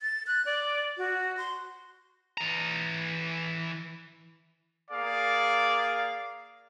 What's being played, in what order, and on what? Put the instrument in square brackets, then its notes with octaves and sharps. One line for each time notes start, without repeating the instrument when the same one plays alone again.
[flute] A6
F#6
D5
F#4
C6
[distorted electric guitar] E3 A#5
[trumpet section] A#3 G#4 F5 [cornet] D5